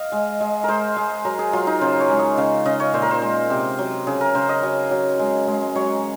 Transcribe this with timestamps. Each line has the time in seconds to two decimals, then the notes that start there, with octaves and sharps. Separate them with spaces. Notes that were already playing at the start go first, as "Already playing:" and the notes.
Already playing: D#5 F5
0.12 G#3
0.41 G#3
0.64 G#3 A#4 C5
0.96 G#3
1.25 F#3 A#4
1.39 G#4
1.53 F#3 F4
1.67 D#4
1.81 C#3 C5
2.00 C#5
2.09 G#3
2.19 D#5
2.37 C#3 F5
2.65 C#3 D#5
2.80 C#5
2.94 A#2 C5
3.02 A#4
3.11 C5
3.21 G#3
3.50 C3
3.79 F#3
4.07 C#3 G#4
4.21 A#4
4.35 C#3 C5
4.49 D#5
4.63 F#3
4.91 F#3
5.19 G#3
5.47 G#3
5.75 F#3 C#5